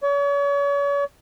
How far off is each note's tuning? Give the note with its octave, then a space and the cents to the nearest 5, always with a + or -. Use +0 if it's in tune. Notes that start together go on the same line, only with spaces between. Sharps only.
C#5 +40